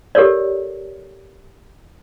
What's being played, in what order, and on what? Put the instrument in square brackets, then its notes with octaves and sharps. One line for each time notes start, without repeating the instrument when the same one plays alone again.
[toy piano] G4 A4 A#4 C#5 D5